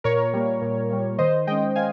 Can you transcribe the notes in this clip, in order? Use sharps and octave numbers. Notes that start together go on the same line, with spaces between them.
A#2 A#4 C#5
G3 A#3
A#2
G3 A#3
D#3 C5 D#5
G#3 C#4 D#5 G5
D#3 F5 G#5